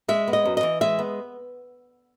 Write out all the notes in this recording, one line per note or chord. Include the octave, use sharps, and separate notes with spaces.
G#3 E5
B3
D#5
F#2
D#5
E3
G#3 E5
B3